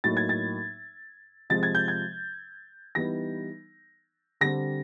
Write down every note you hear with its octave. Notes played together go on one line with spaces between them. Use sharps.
A2 F#3 A#3 D#4 A6
G#6
A6
C3 F3 G#3 A6
G#6
G6
G#6
E3 G3 B3 D#4 A#6
D3 G3 C4 A#6